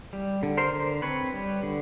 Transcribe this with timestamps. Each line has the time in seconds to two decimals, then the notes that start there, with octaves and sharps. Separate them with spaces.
0.13 G3
0.43 D3
0.57 A#4 C5
0.73 D3
1.02 C4 B4 C#5
1.33 G3
1.63 D3